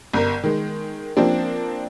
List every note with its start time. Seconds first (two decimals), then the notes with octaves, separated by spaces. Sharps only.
0.13 G1 A#4
0.43 D#3 G#3
1.17 F3 A#3 C4 D4